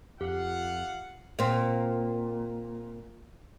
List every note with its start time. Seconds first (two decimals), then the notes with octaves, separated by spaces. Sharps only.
0.21 F2 F4 G4 F5 F#5
1.39 A#2 C4